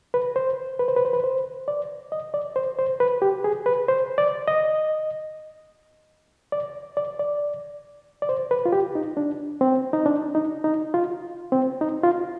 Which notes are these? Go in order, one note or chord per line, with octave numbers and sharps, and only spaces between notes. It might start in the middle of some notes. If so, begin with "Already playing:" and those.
B4
C5
B4
C5
B4
C5
B4
C5
D5
D#5
D5
C5
C5
B4
G4
G#4
B4
C5
D5
D#5
D5
D5
D5
D5
C5
B4
F4
G4
D#4
D4
C4
D#4
D4
D#4
D#4
F4
C4
D#4
F4